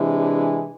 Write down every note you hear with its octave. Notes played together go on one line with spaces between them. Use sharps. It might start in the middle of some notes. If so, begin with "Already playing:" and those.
Already playing: C3 E3 G#3 D4